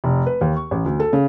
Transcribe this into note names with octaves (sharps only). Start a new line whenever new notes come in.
F1
B4
D#2
C#6
A1
D2
A4
C#3